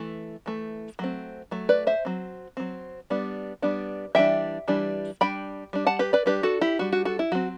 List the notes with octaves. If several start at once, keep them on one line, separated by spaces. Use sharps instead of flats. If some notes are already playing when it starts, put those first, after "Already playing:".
Already playing: E3 A3
E3 A3
F#3 A3 C4
F#3 A3
B4 D5
C5 E5
F#3 C4
F#3 C4
G3 B3 D4
G3 B3 D4
E3 G3 D4 E5 G5
E3 G3 D4
G3 D4 G5 B5
G3 D4
F#5 A5
G4 B4
B4 D5
G3 D4 G4 B4
F#4 A4
E4 G4
G3 D4 F#4
F#4
F#4 A4
E4
F#3 C4 F#4